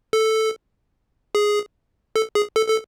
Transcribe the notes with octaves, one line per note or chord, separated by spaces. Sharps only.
A4
G#4
A4
G#4
A4
A4